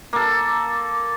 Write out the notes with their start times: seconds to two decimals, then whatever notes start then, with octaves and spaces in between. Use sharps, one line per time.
0.13 A#3 A4